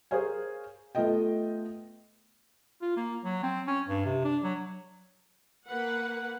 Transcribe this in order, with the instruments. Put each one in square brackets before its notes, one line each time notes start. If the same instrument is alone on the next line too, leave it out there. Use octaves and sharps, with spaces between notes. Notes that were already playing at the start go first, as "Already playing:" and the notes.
[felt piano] G#4 A#4 C5 C#5 F5 G#5
A3 B3 F4 A4 D#5 G5
[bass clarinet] F4
A#3
F#3
C4
C#4
G2
C3
D4
F#3
[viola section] A#3 B4 F#5